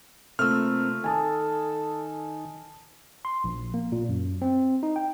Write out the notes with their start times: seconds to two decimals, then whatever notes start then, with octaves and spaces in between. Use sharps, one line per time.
0.39 C3 A3 A#3 C4 F4 E6 F6
1.04 D#3 A4 G#5 A5 D#6
3.25 C6
3.44 A#1
3.74 A#3
3.92 A#2
4.09 F#2
4.42 C4
4.83 D#4
4.96 G5